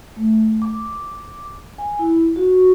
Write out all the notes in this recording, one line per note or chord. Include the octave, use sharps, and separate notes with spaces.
A3
D6
G#5
E4
F#4